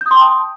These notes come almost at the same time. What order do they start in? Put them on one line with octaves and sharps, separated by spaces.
G6 D#6 C6 G5 A5